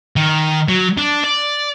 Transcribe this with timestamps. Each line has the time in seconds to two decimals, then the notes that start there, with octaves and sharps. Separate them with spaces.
0.16 D#3
0.68 F#3
0.98 D4
1.24 D5